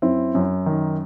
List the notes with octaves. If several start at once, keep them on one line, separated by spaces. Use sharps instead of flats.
F#2 C4 E4
F#2
D#3